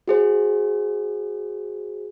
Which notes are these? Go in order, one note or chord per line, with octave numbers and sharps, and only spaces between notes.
F#4 G#4 C5